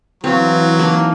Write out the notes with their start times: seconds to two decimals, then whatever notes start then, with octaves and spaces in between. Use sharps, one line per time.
0.24 E3 F#3 C4 B4 F5
0.79 A#3 D#4 A5